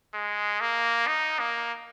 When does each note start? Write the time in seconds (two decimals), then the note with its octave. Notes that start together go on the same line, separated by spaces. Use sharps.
0.14 G#3
0.61 A#3
1.07 D#4
1.40 A#3